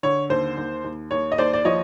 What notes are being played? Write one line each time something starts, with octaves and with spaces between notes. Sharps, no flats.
D3 C#5
D#2 C5
D#2
D#2
D#2 C#5
D#5
D#2 C5 D5
D5
F3 C#5 D#5